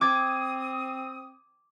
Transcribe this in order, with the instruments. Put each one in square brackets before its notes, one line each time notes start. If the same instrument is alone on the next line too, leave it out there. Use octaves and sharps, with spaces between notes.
[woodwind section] C4 D#6 [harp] D6 G#6 A6